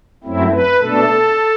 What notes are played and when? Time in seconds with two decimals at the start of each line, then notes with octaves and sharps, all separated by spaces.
0.24 F#2 F#3 A3 C4 E4
0.52 B4
0.80 B2 A3 D4 A4